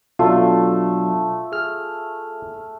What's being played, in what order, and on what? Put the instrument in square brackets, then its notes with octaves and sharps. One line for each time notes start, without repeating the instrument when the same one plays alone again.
[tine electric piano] B2 F#3 D4 [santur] A3 [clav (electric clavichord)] F4
[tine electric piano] G#4 F6